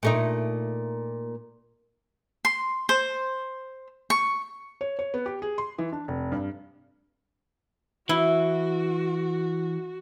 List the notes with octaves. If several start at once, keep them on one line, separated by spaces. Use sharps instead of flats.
A#2 A3 D#4
C6
C5
C#6
C#5
C#5
B3
G4
G#4
C6
E3
D4
F1
G2
E3 E4 F#4